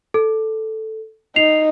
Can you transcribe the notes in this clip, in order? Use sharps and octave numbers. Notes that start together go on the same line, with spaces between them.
A4
D#4 C7 F7